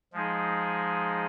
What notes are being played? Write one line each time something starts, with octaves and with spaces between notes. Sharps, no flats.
F3 G#3 D#4 G#4